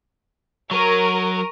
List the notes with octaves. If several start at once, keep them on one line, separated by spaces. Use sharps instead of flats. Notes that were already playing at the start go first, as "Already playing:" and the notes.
F#3 A#4 C#6 D#7